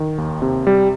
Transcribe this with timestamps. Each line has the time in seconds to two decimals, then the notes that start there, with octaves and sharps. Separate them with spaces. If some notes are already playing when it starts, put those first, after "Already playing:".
Already playing: D#3
0.18 D#2
0.42 C3
0.67 G3